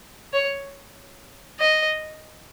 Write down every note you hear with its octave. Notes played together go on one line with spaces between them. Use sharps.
C#5
D#5